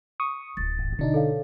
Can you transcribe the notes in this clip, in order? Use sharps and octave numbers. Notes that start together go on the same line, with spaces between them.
C#6 D#6
D1 F4 A6
G#1
B2 D3 D4 D#4
A4 C#5 F5